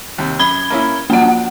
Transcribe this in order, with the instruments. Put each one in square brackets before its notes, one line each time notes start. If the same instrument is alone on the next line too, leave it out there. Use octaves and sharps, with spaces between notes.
[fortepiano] D#2 C3
[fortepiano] F#2 [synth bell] B5 G#6 G7
[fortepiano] A#3 C#4 E4
[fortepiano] F3 F#3 D4 [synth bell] A#3 F#5